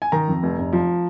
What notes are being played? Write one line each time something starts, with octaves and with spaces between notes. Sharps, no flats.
G#5
D#3 A#5
F2
F1
F1
F3